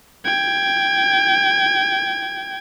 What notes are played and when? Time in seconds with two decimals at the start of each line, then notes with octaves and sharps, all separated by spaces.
0.25 G5 G#6